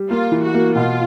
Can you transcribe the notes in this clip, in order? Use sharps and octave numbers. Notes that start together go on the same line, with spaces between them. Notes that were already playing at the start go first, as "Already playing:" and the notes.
Already playing: G3
A#3 F4
E3
F#4
A#3
B2 F4